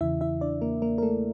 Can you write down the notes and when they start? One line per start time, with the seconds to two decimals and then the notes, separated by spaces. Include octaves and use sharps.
0.01 E2 C#3 E3 E4 E5
0.21 E4 E5
0.41 D4 D5
0.62 A#3 A#4
0.82 A#3 A#4
0.98 A#4
1.02 A3 A4